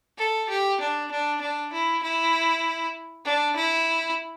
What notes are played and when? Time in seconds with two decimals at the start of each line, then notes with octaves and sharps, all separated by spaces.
0.18 A4
0.49 G4
0.81 D4
1.11 D4
1.41 D4
1.73 E4
2.03 E4
3.25 D4
3.56 E4